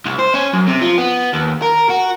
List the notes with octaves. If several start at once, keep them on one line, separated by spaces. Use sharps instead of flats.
C2
C5
C#4
F#2
C3
F3
B3
D#2
A#4
F#4